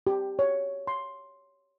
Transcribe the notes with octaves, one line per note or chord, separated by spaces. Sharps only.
G4
C#5
C6